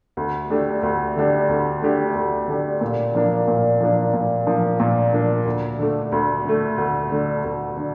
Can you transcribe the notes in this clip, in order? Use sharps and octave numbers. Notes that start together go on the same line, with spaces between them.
D2
D3 A3 D4 G4
D2
D3 A3 D4 G4
D2
D3 A3 D4 G4
D2
D3 A3 D4 G4
A#2
F3 A#3 D4
A#2
F3 A#3 D4
A#2
F3 A#3 D4
A#2
F3 A#3 D4
D2
D3 A3
D2
D3 A3
D2
D3 A3
D2
D3